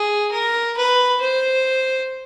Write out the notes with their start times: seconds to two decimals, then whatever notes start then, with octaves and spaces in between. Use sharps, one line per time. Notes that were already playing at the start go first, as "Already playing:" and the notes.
Already playing: G#4
0.32 A#4
0.77 B4
1.21 C5